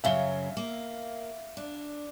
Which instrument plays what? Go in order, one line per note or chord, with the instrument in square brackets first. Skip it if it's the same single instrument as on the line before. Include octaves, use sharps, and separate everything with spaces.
[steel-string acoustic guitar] F#2 C#3 F#3 [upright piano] E5 F5 G7
[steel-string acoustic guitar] A#3
D4